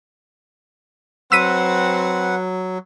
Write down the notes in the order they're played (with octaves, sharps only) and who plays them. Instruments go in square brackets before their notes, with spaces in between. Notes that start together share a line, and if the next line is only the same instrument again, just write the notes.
[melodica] F#3 [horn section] C4 [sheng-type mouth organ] B4 F#5 [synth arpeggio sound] E6 B6 D#7